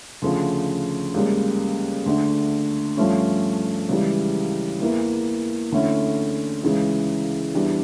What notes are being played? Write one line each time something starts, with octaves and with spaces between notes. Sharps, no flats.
D2 C#3 F3
C#2 C#3 G3 A#3
D2 D3 A3 D4
G2 F3 A3 C#4
C#2 C#3 E3 G3
E2 E3 A#3 E4
D2 D3 A3 C#4 E4
C#2 C#3 E3
E2 E3 G3 D4